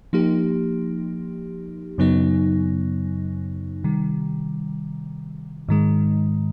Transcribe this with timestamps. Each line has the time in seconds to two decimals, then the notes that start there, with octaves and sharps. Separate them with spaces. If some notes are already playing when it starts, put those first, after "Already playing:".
0.13 F3 A#3 D#4 G4
1.98 F#2 C#3 F#3 B3 D#4
3.84 C3 D#3 G3
5.69 G#2 D#3 G#3